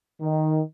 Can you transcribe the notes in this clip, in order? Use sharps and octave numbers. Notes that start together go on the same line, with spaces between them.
D#3